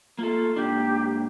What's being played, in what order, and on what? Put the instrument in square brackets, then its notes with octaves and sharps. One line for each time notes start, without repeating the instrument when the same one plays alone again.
[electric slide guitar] A#3 A4 [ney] F4
[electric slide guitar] G#2 A#3 D4 [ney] G4